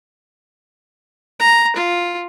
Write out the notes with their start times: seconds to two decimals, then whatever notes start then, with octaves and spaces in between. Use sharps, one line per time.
1.40 A#5
1.76 F4